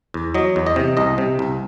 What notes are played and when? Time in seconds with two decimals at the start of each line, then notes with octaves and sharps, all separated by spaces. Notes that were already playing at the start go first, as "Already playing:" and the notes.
0.14 E2
0.34 F#3 D#5
0.56 E2
0.67 D#5
0.76 C3
0.97 C2 D#5
1.18 C3
1.39 C2